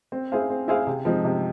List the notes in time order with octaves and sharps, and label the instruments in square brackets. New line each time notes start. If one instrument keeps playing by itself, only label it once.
[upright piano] C4
E4 G#4 C5 F5
C4
E4 G#4 C5 F5
C3
F3 G#3 C4 D#4
C3